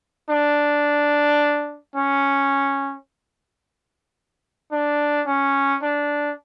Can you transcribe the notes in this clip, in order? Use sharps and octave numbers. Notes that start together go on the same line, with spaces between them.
D4
C#4
D4
C#4
D4